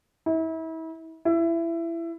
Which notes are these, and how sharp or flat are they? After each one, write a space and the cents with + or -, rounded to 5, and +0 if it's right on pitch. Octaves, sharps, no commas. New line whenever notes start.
E4 -35
E4 +20